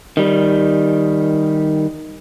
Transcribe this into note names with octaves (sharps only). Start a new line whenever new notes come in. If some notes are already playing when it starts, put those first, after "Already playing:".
D#3 G3